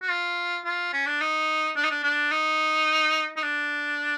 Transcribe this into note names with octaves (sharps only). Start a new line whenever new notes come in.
F#4
F4
F4
C#4
D4
D#4
D4
D#4
D4
D4
D#4
D#4
D4